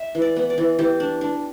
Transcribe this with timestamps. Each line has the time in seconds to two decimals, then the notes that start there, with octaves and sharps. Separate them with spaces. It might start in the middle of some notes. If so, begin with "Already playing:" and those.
Already playing: E5
0.15 E3
0.22 D5
0.36 B3
0.50 D5
0.58 E3
0.79 E3 G4
1.00 D4
1.21 D4